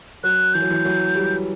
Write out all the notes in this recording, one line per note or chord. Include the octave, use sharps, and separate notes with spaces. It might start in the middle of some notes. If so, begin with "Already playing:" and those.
F#3 F#6
E3 G6
F#3
E3
F#3
G3